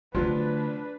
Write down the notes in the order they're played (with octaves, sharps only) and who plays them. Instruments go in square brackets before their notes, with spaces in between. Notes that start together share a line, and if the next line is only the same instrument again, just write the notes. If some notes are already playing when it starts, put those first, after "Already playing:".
[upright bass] D3 A3 [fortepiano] F3 F#3 [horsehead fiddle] D4 B4